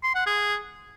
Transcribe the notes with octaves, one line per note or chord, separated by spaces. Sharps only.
C6
F#5
G#4